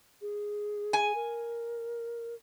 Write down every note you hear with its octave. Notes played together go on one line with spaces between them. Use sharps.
G#4
G#5
A#4